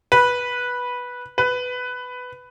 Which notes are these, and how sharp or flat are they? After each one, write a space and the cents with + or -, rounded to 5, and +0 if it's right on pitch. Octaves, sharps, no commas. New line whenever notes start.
B4 -10
B4 +10